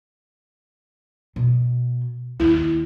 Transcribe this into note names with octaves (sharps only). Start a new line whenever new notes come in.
B2
D#2 E4